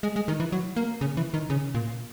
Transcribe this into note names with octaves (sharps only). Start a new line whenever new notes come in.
G#3
G#3
D#3
E3
F#3
A#3
C#3
E3
D#3
C#3
A#2